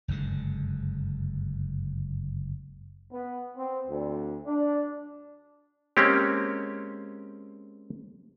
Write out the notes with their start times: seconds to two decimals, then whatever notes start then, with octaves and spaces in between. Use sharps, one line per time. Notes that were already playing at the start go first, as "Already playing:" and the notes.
0.08 F#1 G2 D3 G#3
3.11 B3
3.56 C4
3.87 D2
4.46 D4
5.97 G#3 A#3 C4 C#4 G4